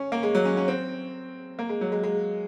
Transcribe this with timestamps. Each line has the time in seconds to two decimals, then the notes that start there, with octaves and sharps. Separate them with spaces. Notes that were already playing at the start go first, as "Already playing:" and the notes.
Already playing: C#4
0.12 A#3
0.23 G#3
0.35 F#3
0.45 C#4
0.57 C#4
0.68 C4
1.59 A#3
1.69 G#3
1.81 F#3
1.92 G#3
2.04 G#3